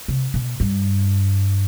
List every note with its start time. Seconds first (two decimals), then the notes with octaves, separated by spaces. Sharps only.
0.08 C3
0.34 B2
0.60 G2